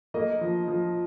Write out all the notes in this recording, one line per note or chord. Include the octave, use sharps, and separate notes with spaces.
A#3 D#5
F3
F3